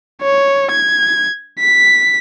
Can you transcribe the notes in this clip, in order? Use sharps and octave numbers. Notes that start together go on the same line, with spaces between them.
C#5
G#6
B6